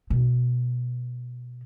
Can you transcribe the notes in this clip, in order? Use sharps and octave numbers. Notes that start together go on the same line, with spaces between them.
B2